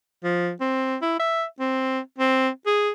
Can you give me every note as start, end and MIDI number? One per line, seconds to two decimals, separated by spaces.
0.24 0.51 53
0.61 0.97 60
1.02 1.16 64
1.20 1.45 76
1.60 2.00 60
2.18 2.49 60
2.66 2.91 68